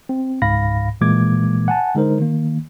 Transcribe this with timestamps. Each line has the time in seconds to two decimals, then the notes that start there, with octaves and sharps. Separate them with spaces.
0.09 C4
0.42 C#2 G#2 F5 B5 A#6
1.01 A#2 E3 G#3 A#3 D6 G#6
1.68 F#5 G#5 A5
1.95 D3 G#3 D#4 A#4 C5
2.19 D#3 A#3